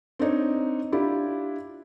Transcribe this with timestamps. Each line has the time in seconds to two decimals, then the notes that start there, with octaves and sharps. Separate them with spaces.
0.19 C4 D4 D#4 C#5
0.92 D4 E4 F4 G4